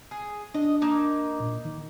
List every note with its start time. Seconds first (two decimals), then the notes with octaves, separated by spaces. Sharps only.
0.11 G#4
0.54 D4 D#5
0.82 A#3 D#4
1.40 A#2
1.65 D#3